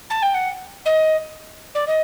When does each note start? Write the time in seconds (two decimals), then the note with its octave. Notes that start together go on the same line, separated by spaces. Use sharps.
0.10 A5
0.22 G5
0.34 F#5
0.85 D#5
1.74 D5
1.87 D#5